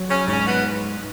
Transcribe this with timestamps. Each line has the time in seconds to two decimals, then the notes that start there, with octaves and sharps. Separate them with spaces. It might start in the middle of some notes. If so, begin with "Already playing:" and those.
Already playing: F#3
0.09 C#3 C#4
0.27 G#2 C#3 C#4
0.47 B2 B3